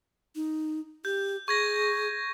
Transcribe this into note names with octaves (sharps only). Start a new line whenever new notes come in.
D#4
G4 G6
G#4 C#6 G#6 A#6